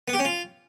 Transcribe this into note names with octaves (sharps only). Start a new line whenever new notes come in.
B3
G4
C#4
F4